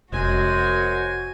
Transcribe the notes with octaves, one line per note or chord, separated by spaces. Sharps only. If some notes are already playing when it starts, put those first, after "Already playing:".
F1 F#2 G#3 F#4 C5 G#5